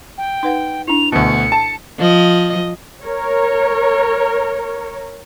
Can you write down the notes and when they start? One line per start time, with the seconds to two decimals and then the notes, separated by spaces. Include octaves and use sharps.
0.18 G5
0.43 D#4 B4 F#5
0.87 D4 E4 F7
1.12 D2 B2 C#7
1.52 A5
1.98 F3 D#5
3.04 A#4 C#5